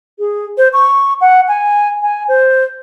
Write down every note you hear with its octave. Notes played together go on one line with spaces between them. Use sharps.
G#4
C5
C#6
F#5
G#5
G#5
C5